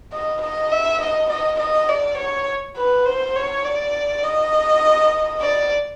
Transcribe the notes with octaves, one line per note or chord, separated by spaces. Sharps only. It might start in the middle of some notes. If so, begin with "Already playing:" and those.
D#5
D#5
E5
D#5
D#5
D#5
D5
C#5
B4
C5
C#5
D5
D#5
D5